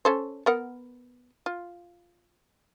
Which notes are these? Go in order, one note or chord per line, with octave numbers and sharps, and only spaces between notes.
C#4 A4 C5
B3 A#4 F#5
F4